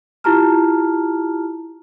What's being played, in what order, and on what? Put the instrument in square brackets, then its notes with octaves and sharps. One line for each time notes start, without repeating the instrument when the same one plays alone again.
[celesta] E4 F4 G4 A5 A#5 F6